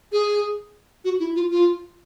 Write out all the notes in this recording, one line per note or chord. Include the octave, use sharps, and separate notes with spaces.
G#4
F#4
E4
F4
F4